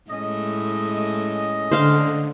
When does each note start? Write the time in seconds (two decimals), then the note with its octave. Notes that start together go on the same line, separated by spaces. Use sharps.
0.10 A2 G#3 A3 C#4 D#5
1.72 D3 C5 F5